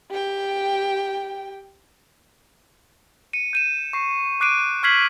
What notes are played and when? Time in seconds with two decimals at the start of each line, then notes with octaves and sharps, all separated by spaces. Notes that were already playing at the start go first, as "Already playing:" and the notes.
0.10 G4 G5
3.33 C#7 D#7
3.53 G6 D#7 E7
3.93 C#6 C7
4.41 D6 F#6 C7 D7 D#7
4.83 C#6 F6 G#6 B6 C7 F#7